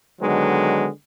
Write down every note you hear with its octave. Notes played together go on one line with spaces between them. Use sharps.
D3 D#3 F#3 G#3 B3